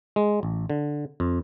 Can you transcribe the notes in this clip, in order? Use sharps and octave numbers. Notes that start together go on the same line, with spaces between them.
G#3
A1
D3
F2